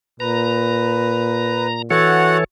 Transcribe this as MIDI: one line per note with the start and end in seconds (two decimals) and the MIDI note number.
0.20 2.03 46
0.20 1.67 71
0.20 1.82 82
1.91 2.44 52
1.91 2.37 66
1.91 2.44 69
1.91 2.44 73
1.91 2.37 78